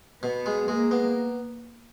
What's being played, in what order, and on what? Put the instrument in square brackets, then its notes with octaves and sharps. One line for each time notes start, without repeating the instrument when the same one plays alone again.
[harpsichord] B2 [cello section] B3
[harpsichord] G#3
[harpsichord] G#3 [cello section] A#3
[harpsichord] B3